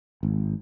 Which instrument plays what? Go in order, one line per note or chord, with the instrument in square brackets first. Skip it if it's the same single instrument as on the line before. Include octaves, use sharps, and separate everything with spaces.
[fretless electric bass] G#1